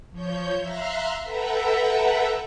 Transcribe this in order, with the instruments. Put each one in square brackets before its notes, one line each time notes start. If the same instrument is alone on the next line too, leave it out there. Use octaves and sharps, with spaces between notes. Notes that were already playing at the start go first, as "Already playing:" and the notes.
[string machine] F3 C#5 G6
E5 F5 A#5 C6 F6 F#6
A4 B4 E5 F#5 G5 A#5